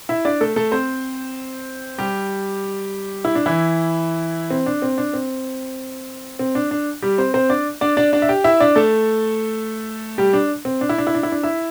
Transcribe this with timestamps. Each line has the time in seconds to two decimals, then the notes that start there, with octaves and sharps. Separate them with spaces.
0.09 E4 E5
0.25 D4 D5
0.41 A3 A4
0.56 A3 A4
0.72 C4 C5
1.98 G3 G4
3.25 E4
3.35 D4
3.46 E3 E4
4.50 C4
4.66 D4
4.82 C4
4.98 D4
5.14 C4
6.39 C4
6.55 D4
6.71 D4
7.02 G3 G4
7.18 C4 C5
7.34 C4 C5
7.50 D4 D5
7.81 D4 D5
7.97 D4 D5
8.13 D4 D5
8.22 E5
8.29 G4 G5
8.44 E4 E5
8.60 D4 D5
8.76 A3 A4
10.18 G3 G4
10.33 D4
10.65 C4
10.81 D4
10.89 E4
10.98 D4
11.07 E4
11.15 D4
11.23 E4
11.32 D4
11.43 E4 E5